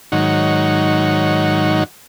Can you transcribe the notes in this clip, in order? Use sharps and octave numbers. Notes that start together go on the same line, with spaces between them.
G#2 D#3 F#3 D#4 C#5 F#5